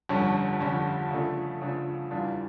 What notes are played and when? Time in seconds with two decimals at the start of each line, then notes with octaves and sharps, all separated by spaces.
0.09 G1 F2 D3 G3 C#4
0.60 G1 F2 D3 G3 C#4
1.11 C#3 F3 A3 D4 A4
1.61 C#3 F3 A3 D4 A4
2.11 E2 E3 G3 D4 F4